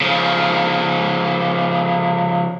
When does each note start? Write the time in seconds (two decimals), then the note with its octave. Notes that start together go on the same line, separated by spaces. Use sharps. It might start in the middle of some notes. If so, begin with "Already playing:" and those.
0.01 C#3 F3